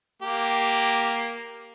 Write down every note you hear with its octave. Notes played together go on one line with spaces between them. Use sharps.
A#3 G4